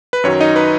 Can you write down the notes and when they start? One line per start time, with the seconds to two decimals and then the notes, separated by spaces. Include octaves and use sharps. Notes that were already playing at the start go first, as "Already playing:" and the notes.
0.13 B4
0.24 F#2 D#3 F#3 C#5
0.40 D#4 D#5
0.56 B4